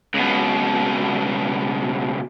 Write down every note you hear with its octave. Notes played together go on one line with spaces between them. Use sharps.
C#2 B2